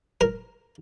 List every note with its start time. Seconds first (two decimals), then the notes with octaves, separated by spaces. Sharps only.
0.21 A#4